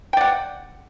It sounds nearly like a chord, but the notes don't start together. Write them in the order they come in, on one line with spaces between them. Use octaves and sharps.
G5 D5 F#5